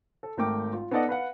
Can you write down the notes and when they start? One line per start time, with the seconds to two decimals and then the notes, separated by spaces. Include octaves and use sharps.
0.23 A4
0.37 G#1 A3 A#4 G5 D6
0.73 F4
0.91 B3 D#4 A4 D5 D#5 F#5
1.09 B4 F5 F#5